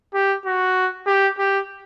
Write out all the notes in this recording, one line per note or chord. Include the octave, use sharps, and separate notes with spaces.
G4
F#4
G4
G4